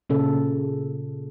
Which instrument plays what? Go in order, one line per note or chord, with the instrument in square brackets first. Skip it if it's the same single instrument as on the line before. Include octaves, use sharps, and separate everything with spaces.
[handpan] A#2 C#3 A4